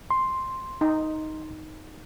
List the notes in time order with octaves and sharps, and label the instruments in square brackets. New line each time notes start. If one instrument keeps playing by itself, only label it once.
[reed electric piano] C6
[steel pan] D#4